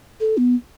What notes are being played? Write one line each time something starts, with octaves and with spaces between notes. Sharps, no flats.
A4
B3